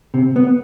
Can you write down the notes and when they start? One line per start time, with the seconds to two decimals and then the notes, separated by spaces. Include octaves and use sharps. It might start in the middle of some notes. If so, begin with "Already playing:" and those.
0.14 C3
0.36 B3